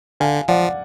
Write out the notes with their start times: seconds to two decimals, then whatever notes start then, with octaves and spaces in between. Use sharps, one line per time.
0.20 D3 F5 G#5
0.48 F3 D5 F#5